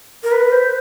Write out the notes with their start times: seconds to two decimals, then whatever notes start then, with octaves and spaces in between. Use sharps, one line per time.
0.23 A#4
0.32 B4
0.52 C5